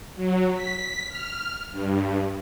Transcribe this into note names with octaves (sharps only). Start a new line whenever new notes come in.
F#3
B6
F6
G2